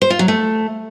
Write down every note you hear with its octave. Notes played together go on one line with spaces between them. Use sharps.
C5
F4
F#3
A3